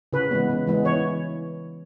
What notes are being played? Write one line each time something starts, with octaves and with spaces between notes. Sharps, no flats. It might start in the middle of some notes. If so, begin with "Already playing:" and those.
C#3 B4
E3 G#3 B3
C#3
E3 G#3 B3
E3 C#5